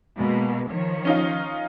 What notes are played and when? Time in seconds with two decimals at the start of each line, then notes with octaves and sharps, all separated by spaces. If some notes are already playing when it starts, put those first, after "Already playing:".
0.18 B2 G#3 A#3
0.70 D#3 F3 C#5
1.05 C#4 D#4 F4